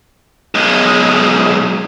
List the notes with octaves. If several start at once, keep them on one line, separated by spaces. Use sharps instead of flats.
B1 G#3